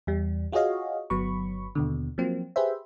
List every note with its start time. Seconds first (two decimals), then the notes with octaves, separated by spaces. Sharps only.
0.07 E2 G3
0.52 F4 F#4 G#4 C#5 D#5 F5
1.10 G1 F#3 B3 B5 C#6
1.75 D#2 B2 D3
2.18 F3 F#3 A#3 C4
2.56 G4 G#4 B4 C5 E5